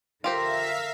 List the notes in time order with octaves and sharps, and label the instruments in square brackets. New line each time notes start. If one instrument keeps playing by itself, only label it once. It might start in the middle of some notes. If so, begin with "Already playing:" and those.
[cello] D3 A#4 [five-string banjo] F4 G4 C5 [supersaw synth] E5 F5 B6